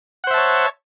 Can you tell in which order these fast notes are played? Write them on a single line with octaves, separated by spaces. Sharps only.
F#5 C5 E5 A5 C#5